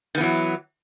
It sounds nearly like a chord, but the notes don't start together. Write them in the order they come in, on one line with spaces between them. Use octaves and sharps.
D#3 B3 E3 F#3